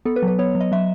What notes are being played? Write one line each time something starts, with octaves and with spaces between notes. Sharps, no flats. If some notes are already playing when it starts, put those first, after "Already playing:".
B3 A4
B4
F#3
B4
B3 C#5
F#3
D#5
F#3 E5